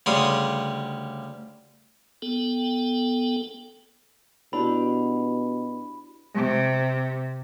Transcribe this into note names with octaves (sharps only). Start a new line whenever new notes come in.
D2 C#3 G3 C6 D#6
B3 A4 G5
B2 D4 E4 F#4 G4 B5
C3